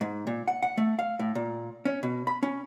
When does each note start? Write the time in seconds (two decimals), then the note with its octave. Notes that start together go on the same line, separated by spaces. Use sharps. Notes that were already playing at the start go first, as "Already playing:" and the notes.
0.01 G#2
0.27 A#2
0.48 F#5
0.62 F#5
0.77 A3
0.99 F5
1.19 A2
1.35 A#2
1.85 C#4
2.03 B2
2.27 B5
2.43 C#4